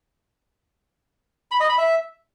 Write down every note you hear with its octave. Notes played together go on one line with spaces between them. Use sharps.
B5
D#5
B5
E5